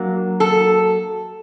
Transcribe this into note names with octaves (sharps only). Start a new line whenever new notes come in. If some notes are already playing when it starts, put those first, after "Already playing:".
Already playing: F#3 A#3 D4
A4